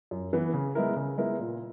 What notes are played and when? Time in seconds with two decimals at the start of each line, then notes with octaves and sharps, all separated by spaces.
0.11 F#2
0.33 E3 B3
0.54 C#3
0.75 G#3 B3 E4 A#4
0.96 C#3
1.18 G#3 B3 E4 A#4
1.39 A#2